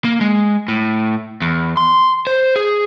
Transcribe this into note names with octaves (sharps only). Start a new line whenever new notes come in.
A#3
G#3
A2
E2
C6
C5
G#4